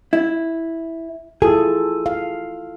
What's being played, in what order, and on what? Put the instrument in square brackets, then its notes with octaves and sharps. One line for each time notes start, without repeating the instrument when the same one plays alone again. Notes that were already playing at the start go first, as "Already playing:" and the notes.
[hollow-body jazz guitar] E4
[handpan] E4 F4 A4 [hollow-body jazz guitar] G#4
[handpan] F5